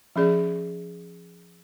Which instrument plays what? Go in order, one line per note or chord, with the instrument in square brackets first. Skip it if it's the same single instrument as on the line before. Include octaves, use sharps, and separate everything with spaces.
[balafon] F3 C#4 G#4 D5